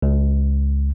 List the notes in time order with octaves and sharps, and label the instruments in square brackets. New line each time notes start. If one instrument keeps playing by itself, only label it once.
[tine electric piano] C#2